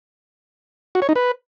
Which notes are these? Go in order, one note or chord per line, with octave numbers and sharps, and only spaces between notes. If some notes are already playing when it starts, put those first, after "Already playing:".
F#4
C#5
D#4
B4